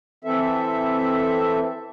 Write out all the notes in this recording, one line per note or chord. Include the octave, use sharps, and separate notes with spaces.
E3 C4 A4 E5